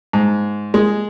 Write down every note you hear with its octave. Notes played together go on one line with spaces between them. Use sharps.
G#2
G#3